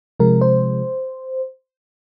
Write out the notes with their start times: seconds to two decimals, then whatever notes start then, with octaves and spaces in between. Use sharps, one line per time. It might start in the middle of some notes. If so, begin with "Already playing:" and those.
0.20 C3 F3 G#3 A#4
0.41 C5